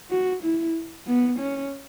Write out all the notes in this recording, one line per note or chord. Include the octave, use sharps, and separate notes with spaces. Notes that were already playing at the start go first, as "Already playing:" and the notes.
F#4
E4
B3
C#4